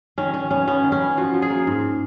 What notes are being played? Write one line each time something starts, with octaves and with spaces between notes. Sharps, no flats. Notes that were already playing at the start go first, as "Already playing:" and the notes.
D#3 C#4
D#3 C#4
B3 C#4
B3 C#4
D#3
C#4
B3
F3 F#4
F3
G#4
A#3
G#2